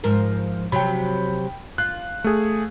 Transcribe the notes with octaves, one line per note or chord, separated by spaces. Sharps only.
G#2 F3 A#4
C3 F#3 G5 B5
F4 F#6
A3 G#4